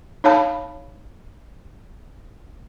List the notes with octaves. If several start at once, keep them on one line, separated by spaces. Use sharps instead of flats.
D#4 C#5 F5 A5 B5